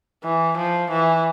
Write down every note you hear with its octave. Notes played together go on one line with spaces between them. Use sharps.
E3
F3
E3